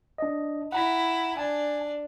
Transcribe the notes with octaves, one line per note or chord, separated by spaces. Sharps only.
D4 D#5
E4 F#5 A#5 B6
D4 G#5 A5